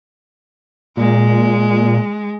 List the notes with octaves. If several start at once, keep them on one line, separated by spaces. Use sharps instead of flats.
A#2 G#3